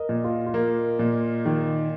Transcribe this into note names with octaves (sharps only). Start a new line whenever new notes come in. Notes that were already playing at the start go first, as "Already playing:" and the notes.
Already playing: A#4 D#5
A#2
F4
F4
A#3
A#2
D#3